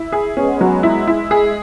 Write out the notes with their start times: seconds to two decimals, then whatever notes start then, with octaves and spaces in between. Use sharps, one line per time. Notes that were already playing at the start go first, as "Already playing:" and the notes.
Already playing: E4
0.12 G#4
0.36 G#3 B3 C#4
0.61 F#3
0.83 G#3 E4
1.08 E4
1.31 G#4